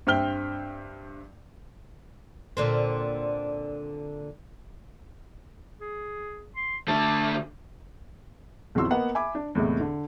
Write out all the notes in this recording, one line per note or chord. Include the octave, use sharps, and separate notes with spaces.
G2 C4 E5 G5 F6 G7
A#2 D3 C4
G#4
C6
D3 A3 A5
B1 F2 E3 F#4 C6 E6
A#3 B3 D#5 F#5
E5 G#5 B5 D6
D4
E2 A2 C3 E3 G#3
D3